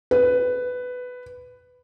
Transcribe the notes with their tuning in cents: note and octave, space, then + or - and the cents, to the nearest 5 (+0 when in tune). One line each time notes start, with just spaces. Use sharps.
B4 +10